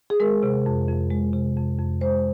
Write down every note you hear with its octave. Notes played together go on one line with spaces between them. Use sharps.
G#4
G#3 A#4
C3
F2
F2
G#3
C3
F2
F2
G#3 C5